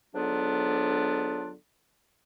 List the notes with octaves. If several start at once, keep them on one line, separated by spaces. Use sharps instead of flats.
G#2 D3 F#3 B3 D4 F4